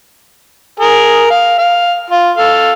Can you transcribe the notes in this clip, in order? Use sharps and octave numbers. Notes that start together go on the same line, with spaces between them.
G#4 A#4
F5
F5
F4
A4 F5